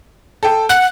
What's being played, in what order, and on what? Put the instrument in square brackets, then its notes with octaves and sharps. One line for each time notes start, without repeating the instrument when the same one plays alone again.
[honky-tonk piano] A4 G5
[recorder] F#5 [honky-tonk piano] F#6